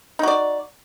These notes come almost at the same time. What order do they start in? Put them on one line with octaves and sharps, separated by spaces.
D#4 F#4 D5